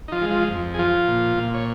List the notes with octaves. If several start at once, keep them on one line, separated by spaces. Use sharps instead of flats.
D#4
F3 F4
G#3
F3 F4
F2
G#4
F3 F4
A#2
A#2
C#5